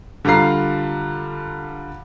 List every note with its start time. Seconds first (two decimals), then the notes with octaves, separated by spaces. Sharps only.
0.25 D3 G3 F4 A#5 C7